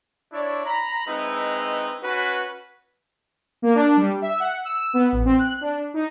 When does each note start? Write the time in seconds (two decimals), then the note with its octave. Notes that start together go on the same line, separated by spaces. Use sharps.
0.33 D4 E4 C#5 D5
0.66 A#5 B5
1.07 G#3 C4 D#4 E4 B4
2.03 C#4 F#4 B4
3.62 A#3
3.75 D4
3.97 G3
4.22 E5
4.40 F#5
4.65 E6
4.94 B3
5.12 A1
5.25 C4
5.39 F#6
5.61 D4
5.94 D#4